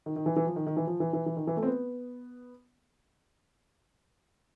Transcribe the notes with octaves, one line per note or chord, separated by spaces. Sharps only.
D#3
D#3
E3
E3
F3
D#3
D#3
E3
F3
E3
E3
E3
D#3
E3
A3
C4
B3